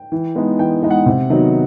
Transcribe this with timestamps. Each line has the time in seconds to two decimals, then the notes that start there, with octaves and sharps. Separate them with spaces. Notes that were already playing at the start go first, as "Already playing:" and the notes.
Already playing: G5
0.12 E3
0.35 G#3 B3 D#4
0.59 E3 G5
0.82 G#3 B3 D#4
0.91 F#5
1.06 C3
1.29 D#3 F#3 B3 D#4